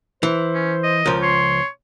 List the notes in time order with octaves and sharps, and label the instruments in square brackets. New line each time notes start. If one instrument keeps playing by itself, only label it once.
[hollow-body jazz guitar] E3 [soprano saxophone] C5
[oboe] C#4
D#5
[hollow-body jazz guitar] C#2 F3 [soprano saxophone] A#4
[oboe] C#5 [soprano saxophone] C6